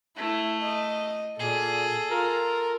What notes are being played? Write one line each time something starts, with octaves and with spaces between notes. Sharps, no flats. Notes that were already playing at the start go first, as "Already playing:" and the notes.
A3 E4
D#5
A#2 G#4 A4
F4 A#4